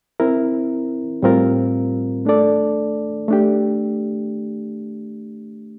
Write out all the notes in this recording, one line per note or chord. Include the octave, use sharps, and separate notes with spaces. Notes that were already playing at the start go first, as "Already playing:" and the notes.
C4 E4 A#4
A2 G3 C4 F4 A#4
A3 D4 A4 D5
A3 D4 G4